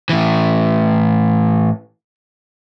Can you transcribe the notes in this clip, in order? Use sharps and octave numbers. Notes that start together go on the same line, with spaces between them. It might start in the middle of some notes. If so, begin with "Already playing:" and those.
A2 E3